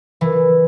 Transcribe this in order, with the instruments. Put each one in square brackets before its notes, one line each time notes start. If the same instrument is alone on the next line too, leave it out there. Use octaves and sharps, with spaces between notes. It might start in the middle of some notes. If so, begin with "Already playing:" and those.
[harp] E3